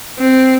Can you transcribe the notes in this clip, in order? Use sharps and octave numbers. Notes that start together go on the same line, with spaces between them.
C4